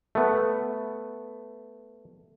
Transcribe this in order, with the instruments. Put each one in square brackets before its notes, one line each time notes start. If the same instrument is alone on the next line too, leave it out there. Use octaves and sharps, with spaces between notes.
[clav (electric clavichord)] A3 B3